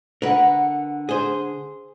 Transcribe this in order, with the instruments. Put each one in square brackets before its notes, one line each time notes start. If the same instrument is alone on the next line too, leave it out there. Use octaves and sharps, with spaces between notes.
[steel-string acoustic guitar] D3 F#5 [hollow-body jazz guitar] A#4 B4
[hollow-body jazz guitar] G#4 C5